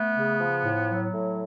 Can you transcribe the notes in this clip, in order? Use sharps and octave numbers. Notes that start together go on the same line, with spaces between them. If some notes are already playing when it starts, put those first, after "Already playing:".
Already playing: A3 B3
C#3
F3
A2
F#3
A2